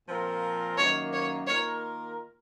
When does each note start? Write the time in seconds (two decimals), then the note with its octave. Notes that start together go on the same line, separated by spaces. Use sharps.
0.09 A#2 F3 C4 F4 A#4
0.78 F#2 D#3 A#3 C#5
1.13 C#5
1.47 D#3 A#3 F4 A#4 C#5